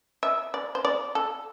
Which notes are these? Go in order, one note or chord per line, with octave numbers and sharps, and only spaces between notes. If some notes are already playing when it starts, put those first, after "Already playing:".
E5
D5
C5
D5
A4